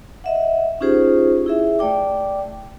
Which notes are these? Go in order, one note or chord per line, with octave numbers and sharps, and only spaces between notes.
D#5 E5 F#5
C#4 D#4 F4 G4 G#4 C5
E4 G#4 E5
A3 D5 G5 D6